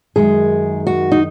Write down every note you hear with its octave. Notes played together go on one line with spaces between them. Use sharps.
F#2 D#3 G#3 G#4
F#4
D#4